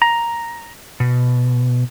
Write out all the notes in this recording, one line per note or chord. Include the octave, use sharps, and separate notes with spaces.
A#5
B2